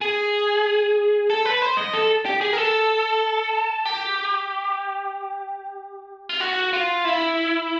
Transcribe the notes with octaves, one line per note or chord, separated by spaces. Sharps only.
G#4
A4
B4
C5
D#5
A4
G4
G#4
A#4
A4
G4
F4
F#4
F4
E4